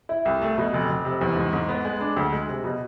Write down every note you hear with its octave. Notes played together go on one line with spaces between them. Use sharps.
E4
C2
A3
B2
F1
F1
C3
E2
G#2
G#2
B3
G#3
D4
D2
G#3
C3
B2